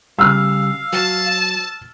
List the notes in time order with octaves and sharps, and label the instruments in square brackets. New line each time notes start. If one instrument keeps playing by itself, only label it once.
[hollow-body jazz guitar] C#3 G3 [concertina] F5 [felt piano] E6 F6
[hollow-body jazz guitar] F#3 [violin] A5